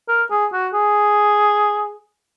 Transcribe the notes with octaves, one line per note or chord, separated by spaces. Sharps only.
A#4
G#4
F#4
G#4